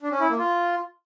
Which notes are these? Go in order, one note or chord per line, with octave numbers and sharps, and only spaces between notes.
D4
C#4
E4
A#3
F4